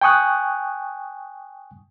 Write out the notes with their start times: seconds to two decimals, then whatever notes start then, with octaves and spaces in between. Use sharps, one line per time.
0.01 G5 G#5 C#6 D#6 F#6